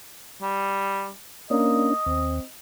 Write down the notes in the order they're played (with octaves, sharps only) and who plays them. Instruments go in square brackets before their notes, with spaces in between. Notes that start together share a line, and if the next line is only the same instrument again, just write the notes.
[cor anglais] G3
[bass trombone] A#3 [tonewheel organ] C#4 D4 [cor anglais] D#5
[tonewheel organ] D#2 [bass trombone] C4